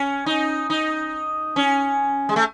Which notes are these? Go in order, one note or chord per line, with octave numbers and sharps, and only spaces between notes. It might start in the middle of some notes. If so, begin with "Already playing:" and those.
Already playing: C#4
D#4
D#4
C#4
G#3
A3